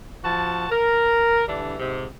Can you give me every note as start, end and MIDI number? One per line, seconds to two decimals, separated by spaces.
0.24 0.67 53
0.24 0.67 66
0.24 0.67 81
0.70 1.43 70
1.48 1.75 50
1.48 1.75 52
1.48 1.75 55
1.48 1.75 62
1.78 2.06 44
1.78 2.06 48